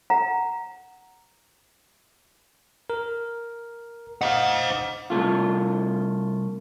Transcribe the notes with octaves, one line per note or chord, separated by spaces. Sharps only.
F5 F#5 A#5
A#4
C5 D#5 F5 F#5
C2 G2 A3 F4